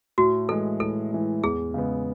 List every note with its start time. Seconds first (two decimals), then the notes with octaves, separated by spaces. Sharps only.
0.18 A2 F#4
0.49 E3 G#3 A4
0.80 A2 A4
1.12 E3 G#3
1.43 E2 G#4
1.74 C#3 G#3 B3